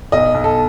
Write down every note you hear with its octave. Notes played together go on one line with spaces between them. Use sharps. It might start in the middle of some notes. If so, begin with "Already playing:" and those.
B1 D#5
B1
A4